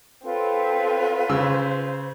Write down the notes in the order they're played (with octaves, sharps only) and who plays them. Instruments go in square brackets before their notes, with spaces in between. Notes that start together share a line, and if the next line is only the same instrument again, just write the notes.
[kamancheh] C4 A4 [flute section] F4 B4 C#5
[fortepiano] C#3 E6 [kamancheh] C5